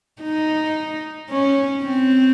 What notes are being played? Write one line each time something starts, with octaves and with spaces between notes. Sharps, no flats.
D#4
C#4
C4